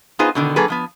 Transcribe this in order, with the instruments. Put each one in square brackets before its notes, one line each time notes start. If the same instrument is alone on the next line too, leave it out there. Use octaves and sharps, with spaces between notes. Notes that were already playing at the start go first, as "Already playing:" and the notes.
[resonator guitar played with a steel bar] B3 D#4 F4 G#4 B4 C5
B2 D3 D#3
F#3 A#3 G#4 A4 B4
A2 F3 B3